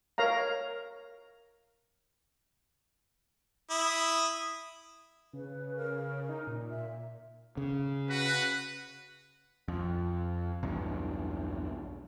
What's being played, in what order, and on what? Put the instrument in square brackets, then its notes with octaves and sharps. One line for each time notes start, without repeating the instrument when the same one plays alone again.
[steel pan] A#4 C#5 F5 A#5
[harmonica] E4 D#6
[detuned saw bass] C#3 [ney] B4
[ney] A#4
[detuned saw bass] D#4
A#2
[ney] E5
[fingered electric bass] C#3
[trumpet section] F#4 B4
[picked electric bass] F2
B1 E2 G2